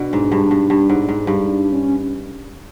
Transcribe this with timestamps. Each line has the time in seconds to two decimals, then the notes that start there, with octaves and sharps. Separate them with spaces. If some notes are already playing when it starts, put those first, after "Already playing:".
Already playing: B2 D4
0.13 G#2
0.32 G2
0.51 G2
0.70 G2
0.90 G#2
1.08 G#2
1.27 G2
1.47 D4
1.72 C#4